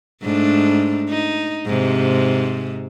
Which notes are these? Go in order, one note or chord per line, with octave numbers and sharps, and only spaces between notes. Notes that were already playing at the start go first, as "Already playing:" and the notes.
G#2 A3 D4
D#4
G#2 C3